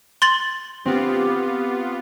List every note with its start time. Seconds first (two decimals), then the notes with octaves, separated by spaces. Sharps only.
0.22 C6 A6 F#7
0.85 B3 C4 F4 G4